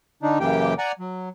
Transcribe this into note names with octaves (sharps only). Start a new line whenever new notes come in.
D3 D4 D#4
F#2 C#3 E3 A#3 G4 G5
D5 F#5 G#5 A#5
F#3